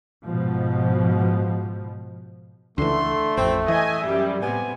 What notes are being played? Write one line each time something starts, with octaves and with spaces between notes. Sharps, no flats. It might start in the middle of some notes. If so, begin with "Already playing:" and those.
G#2 B2 F3
C#2 D3 E3 A3 C6
A1 F2 C4
E3 D#5 E5 G#5
F#2 G3
A2 C3 B3 G#5